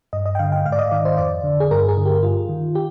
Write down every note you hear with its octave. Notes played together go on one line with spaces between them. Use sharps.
G2 D#5
D#5
G5
D3 F5
G5
G#2 F5
D5
D#5
D#3 D5
C5
F2 D5
D3
G#4
G2 A#4
G#4
D3
G4
G2 F4
D#3
G4